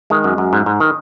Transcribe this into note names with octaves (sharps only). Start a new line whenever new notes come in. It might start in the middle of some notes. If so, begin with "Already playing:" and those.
D#3 G#3
F#2
F#2
G#2
G#2
D#3